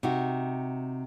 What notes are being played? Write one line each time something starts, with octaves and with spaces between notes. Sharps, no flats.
C3 D#4 F#4